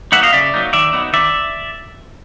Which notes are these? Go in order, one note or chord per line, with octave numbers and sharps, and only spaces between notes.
F#3 A#3 D#4 E5 F#5
D#5 F5
C#3 D5 E5
F#3 A#3 D#4
D#3 D5 E5
F#3 B3 D#4
D#3 D5 E5